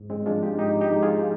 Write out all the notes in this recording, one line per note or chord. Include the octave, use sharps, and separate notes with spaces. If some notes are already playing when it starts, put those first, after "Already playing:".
Already playing: G#2
G#3 C4
F3 G#3 D4 F4
D#4 G4
G#2 D#4 G4
D#4 G4
F3 G#3
F4 G#4